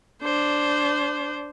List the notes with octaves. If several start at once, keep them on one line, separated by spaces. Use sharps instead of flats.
D4 C5